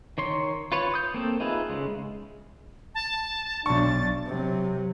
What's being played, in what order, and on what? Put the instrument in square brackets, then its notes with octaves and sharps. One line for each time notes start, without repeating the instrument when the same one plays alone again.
[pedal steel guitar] D#3 C#5 C6
F4 B4 C#5
D#6 G6
A#3 C4 A4
D#4 F4 G#4 B4 E5
C#3 G#3
[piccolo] A5
[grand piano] B1 C#6 [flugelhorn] D4 [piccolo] A6
[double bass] C3 F#3